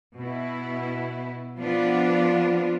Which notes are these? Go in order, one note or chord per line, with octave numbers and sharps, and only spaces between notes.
B2 B3 E4
F3 B3 D4 F4